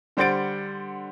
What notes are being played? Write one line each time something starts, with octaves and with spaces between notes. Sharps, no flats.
D3 G3 C5 F#5 A6 D7